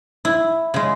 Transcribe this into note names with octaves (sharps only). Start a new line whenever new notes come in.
E4
C#3 G#3